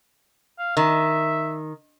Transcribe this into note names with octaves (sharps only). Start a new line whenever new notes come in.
F5
D#3 E5